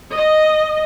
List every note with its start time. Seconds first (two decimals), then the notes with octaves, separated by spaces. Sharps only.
0.14 D#5